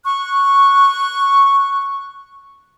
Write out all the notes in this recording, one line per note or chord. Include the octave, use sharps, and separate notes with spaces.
C#6 F#6